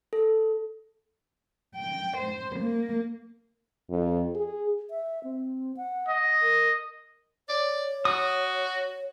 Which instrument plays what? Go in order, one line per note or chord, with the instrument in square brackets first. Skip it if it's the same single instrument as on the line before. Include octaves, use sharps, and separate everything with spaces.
[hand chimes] A4
[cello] G5
C5
A#3
[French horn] F2
G#4
[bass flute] E5
C4
F#5
[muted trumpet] D#5
[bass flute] A#4
[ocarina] C#5 [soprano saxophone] D5
[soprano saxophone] F#4 [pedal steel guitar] D#6